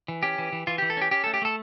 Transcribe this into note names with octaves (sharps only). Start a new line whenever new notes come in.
E3
C#4 G4
E3
E3
E3 F4
E3 G4
A4
C#4 G4
C#4 G4
A3 A4
G4
A3 A4